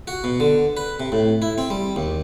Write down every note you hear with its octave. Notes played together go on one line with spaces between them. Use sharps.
F#4
B2
D3
B4
C3
A2
E4
C4
G3
D#2